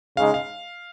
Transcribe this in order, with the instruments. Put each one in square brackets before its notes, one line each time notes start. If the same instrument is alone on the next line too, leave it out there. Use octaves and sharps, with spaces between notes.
[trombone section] C#3 G#3 D#4 [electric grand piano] F5
[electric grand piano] F5